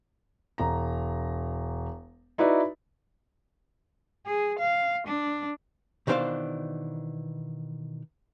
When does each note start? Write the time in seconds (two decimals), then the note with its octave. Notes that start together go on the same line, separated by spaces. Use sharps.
0.58 E1 A#5
2.38 D#4 E4 F#4 B4 D5 E5
4.26 G#4
4.59 F5
5.07 D4
6.07 B2 D#3 E3 D4 C5 F5